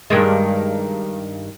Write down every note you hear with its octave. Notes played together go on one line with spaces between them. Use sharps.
G2 D#3 G#3